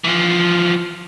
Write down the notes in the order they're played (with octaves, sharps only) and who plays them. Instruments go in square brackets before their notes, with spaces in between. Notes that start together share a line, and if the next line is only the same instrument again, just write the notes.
[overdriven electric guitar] E3 F3